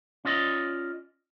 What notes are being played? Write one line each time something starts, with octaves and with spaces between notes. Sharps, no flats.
C#4 F4 D5 D#5